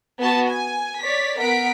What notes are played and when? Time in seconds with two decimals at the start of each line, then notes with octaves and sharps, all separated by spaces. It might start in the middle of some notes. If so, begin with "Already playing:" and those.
0.20 B3 F#4 A5
0.51 G#5
1.02 C#5 D5 B6
1.38 B3 A#4 F#5 B6 D7